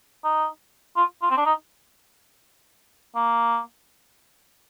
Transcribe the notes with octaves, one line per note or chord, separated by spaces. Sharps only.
D#4
F4
F4
C4
D4
D#4
A#3